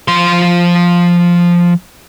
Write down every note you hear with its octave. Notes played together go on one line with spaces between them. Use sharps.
F3 C6